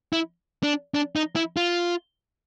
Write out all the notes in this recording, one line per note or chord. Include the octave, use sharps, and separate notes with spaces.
E4
D4
D4
D#4
E4
F4